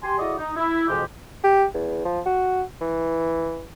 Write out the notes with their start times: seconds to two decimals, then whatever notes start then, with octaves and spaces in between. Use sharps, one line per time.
0.03 G4 G#5 C6
0.18 E4 F#4 G#4 A4 D5 D#5
0.38 D#4
0.56 E4
0.88 F2 G#2 B2 E3 G#3 G4
1.44 G4
1.74 E2
2.05 F3
2.26 F#4
2.81 E3